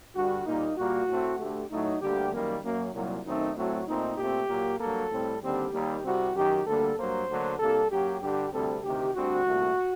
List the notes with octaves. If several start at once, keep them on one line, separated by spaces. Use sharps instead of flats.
G2 D3 G3 F#4
A#2 G3 A#3 D#4
A#2 G3 A#3 F#4
A2 A3 C4
D2 D3 A3 G4
A2 F#3 A3 D#4
D2 D3 G3 A#3 G4
F#2 D#3 G3 A#3
F#2 F#3 A#3
C2 A#2 F#3
F#2 D#3 A3 C4 D#4
A2 F#3 A3 C4 F#4
A#2 A3 C4 D#4
A#2 A3 C4 G4
A#2 F#3 A#3
G2 F#3 A#3 A4
A2 G3 C4
D#2 D3 G3 C4 G4
D#2 D#3 G3 A#3
C2 C3 G3 C4 F#4
F#2 D#3 F#3 G4
D2 D3 G3 A#3 A4
G2 F#3 A#3 C5
D2 D3 F#3 A#3
C2 C3 G3 A#3 A4
F#2 F#3 A#3 G4
G2 D3 G3 G4
D2 C3 G3 C4 A4
D2 C3 D#3 G4
D2 D3 G3 C4 F#4
C2 A#2 A3